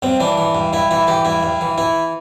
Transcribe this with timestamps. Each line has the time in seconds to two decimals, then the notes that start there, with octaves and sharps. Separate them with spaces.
0.02 G2 C4
0.20 E3 D4
0.38 E3
0.55 G2
0.73 G2 E4
0.91 E3 E4
1.07 E3 G4
1.25 G2 E4
1.43 G2
1.61 E3
1.78 E3 E4